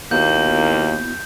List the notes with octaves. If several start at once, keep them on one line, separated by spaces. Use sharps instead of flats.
D#2 A#3 B3 E4 F#4 G6